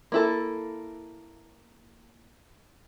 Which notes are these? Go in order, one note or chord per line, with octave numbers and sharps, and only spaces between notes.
A#3 E4 A4